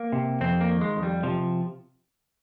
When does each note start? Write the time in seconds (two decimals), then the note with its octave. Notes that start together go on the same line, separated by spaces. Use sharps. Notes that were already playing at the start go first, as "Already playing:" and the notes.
Already playing: A#3
0.13 C3
0.41 F2 C4
0.61 A#3
0.68 D#3
0.81 G#3
0.96 F2
1.03 G3
1.23 C3 F3